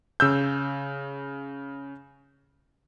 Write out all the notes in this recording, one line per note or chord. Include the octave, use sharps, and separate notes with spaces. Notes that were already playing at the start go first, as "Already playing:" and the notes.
C#3 E6 G6